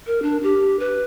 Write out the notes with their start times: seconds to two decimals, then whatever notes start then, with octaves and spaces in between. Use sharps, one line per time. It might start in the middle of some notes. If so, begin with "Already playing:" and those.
0.06 A#4
0.22 D4
0.43 G4
0.80 B4